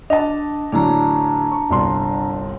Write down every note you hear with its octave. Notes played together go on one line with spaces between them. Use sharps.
D4 D#5 F#5 A5
A2 D3 F#3 D4 A5 A#5
C#6
G1 C2 C6